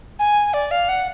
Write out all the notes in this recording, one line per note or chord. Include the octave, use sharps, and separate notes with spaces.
G#5
D5
F5
F#5